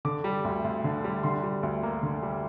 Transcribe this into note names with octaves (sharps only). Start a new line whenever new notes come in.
D3 D6
G3
D2
D2
D3
G3
D3 C6
G3
D2
A#3
D3
G3